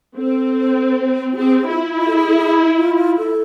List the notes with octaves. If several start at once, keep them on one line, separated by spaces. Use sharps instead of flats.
C4 A4
F4
C4 G#4
G#4
E4 F4
F4
A4
G#4
A4
G#4
F4
F4
A4